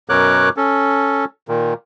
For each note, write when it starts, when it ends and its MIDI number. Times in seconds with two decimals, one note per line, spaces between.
0.09 0.49 42
0.09 0.49 47
0.09 0.49 70
0.09 0.49 73
0.09 0.49 86
0.09 0.49 90
0.57 1.25 61
0.57 1.25 69
1.48 1.74 46
1.48 1.74 51